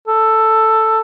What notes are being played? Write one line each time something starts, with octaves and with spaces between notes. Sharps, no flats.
A4